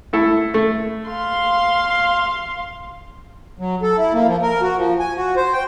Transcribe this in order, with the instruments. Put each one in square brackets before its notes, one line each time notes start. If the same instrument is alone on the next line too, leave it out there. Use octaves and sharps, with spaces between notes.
[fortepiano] A3 E4 A4
A3
[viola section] F5 C6
[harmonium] F#3
A4
E4
A#3
F3
A#4
F#4
F3
G#5
F#4
C5
G5